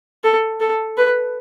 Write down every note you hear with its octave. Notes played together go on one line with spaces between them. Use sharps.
A4
A4
B4